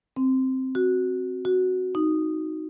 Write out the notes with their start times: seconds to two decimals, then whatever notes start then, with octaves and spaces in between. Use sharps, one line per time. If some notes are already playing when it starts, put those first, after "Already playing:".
0.16 C4
0.75 F#4
1.45 F#4
1.95 D#4